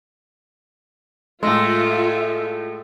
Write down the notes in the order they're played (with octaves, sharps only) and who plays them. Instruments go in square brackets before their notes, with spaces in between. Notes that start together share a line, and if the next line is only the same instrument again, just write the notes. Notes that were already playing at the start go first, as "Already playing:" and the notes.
[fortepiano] A2 G#3 [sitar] A3 [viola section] F4 E5 [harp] C6 E6 A#6